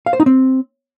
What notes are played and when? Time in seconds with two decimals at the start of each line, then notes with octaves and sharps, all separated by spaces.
0.06 F5
0.13 C5
0.20 D#4
0.26 C4